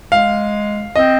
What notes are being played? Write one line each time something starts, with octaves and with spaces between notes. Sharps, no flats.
G#3 F5
C4 D#5